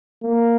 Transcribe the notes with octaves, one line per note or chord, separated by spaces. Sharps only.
A#3